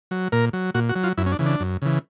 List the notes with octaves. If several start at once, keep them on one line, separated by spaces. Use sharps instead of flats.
F#3
A#2 A#4
F#3
A#2 F#4
F#4
F#3
F4
F#2 E4
C#4
D4
C#3 E3
D4
F#2
C#3 E3